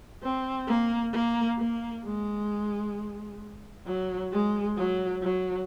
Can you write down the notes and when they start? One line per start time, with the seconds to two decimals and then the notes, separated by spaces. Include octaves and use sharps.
0.23 C4
0.67 A#3
1.13 A#3
1.59 A#3
2.04 G#3
3.86 F#3
4.32 G#3
4.77 F#3
5.23 F#3